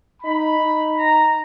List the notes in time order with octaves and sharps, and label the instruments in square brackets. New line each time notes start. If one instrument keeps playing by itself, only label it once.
[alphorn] D#4 [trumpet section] B5
[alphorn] D#4
[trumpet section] A#5